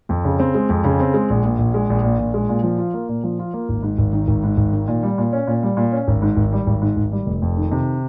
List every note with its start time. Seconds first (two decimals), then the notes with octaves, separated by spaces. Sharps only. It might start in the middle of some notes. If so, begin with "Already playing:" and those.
0.09 F2
0.24 C#3
0.39 C4
0.55 G#3
0.69 F2
0.84 C#3
1.00 C4
1.14 G#3
1.30 A#1
1.44 A#2
1.59 A#1
1.74 G#3
1.90 A#1
2.04 A#2
2.19 A#1
2.34 G#3
2.49 A#2
2.63 F3
2.78 F4
2.94 A#3
3.09 A#2
3.24 F3
3.39 F4
3.53 A#3
3.69 G#1
3.83 G#2
3.98 G#1
4.13 D#3
4.28 G#1
4.44 G#2
4.57 G#1
4.73 D#3
4.88 A#2
5.03 G3
5.18 A#2
5.33 C#4
5.47 A#2
5.63 G3
5.77 A#2
5.92 C#4
6.08 G#1
6.22 G#2
6.37 G#1
6.52 G3
6.67 G#1
6.82 G#2
6.97 G#1
7.12 G3
7.26 F1
7.42 F2
7.57 D#3
7.71 C3